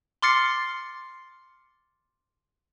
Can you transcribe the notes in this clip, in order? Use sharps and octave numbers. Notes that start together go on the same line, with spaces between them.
C6 D6 F6 A6 C7 C#7